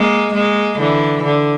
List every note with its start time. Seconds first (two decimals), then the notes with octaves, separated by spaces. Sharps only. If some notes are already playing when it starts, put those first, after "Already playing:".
Already playing: G#3 A#3
0.33 G#3 A#3
0.78 D3 E3
1.24 D3